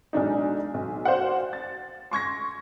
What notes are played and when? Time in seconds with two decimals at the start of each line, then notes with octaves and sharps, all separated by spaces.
0.13 B1 G#3 D4 D#4
0.74 B1
1.05 F#4 C5 D5 F5 F#5
1.53 A6
2.11 C6 C#6 G#6 A#6